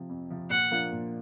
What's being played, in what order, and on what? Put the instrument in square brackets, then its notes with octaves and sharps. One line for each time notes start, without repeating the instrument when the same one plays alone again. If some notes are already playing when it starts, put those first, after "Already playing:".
Already playing: [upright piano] C3 F3
F2
C3 F3
[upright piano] A#2 [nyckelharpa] F#5
[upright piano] F3 A#3 D4 F4
A#2